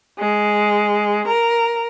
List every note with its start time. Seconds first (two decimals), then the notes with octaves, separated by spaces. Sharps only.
0.18 G#3
1.27 A#4